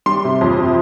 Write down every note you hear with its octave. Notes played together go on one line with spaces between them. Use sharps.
G3 C6
C3
F2
C3